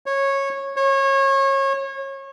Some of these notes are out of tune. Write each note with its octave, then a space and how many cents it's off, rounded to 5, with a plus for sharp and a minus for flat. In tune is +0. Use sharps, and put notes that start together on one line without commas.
C#5 -15
C#5 -30